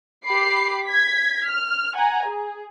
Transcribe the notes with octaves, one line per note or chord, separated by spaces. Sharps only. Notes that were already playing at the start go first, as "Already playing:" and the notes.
G4 B5 D6 C7
G#6 B6
F6
F#5 G#5 A#5
G#4